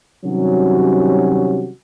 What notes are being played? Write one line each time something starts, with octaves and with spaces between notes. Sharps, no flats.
C3 D#3 F#3 G3 C#4 F#4